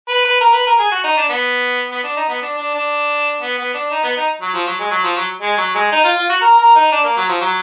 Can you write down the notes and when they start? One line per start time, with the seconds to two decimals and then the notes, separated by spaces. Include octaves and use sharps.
0.08 B4
0.25 B4
0.41 A#4
0.53 B4
0.67 A#4
0.79 G#4
0.92 F#4
1.04 D#4
1.17 D4
1.29 B3
1.91 B3
2.04 D4
2.16 D#4
2.29 B3
2.42 D4
2.58 D4
2.75 D4
3.42 B3
3.58 B3
3.74 D4
3.92 D#4
4.04 B3
4.17 D#4
4.41 F#3
4.54 F3
4.67 F#3
4.80 G#3
4.91 F#3
5.04 F3
5.17 F#3
5.42 G#3
5.58 F#3
5.75 G#3
5.92 D#4
6.04 F4
6.17 F4
6.29 F#4
6.41 A#4
6.59 A#4
6.76 D#4
6.92 D4
7.04 A#3
7.17 F#3
7.29 F3
7.41 F#3